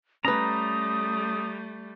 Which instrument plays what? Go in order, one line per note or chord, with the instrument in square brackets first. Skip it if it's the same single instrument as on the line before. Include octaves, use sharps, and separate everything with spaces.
[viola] G3 A3 [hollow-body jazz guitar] C#4 B4 [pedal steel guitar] A#5 [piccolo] D#6